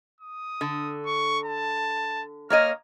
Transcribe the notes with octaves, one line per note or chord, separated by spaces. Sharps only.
D#6
D3
C#6
A5
A#3 C#5 D#5 F6